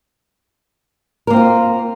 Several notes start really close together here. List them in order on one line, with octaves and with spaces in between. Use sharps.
A#4 A#3 C4 F4